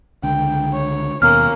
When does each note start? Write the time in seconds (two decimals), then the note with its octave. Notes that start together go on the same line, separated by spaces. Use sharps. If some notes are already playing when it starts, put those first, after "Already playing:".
0.23 C#2 D3 G5
0.74 C#5
1.22 D#2 B2 A#3 C#4 F6